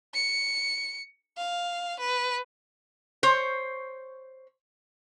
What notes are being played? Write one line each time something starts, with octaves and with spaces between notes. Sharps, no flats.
C#7
F5
B4
C5 C#5